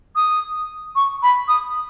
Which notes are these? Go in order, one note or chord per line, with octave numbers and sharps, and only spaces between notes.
D#6
C#6
B5
D#6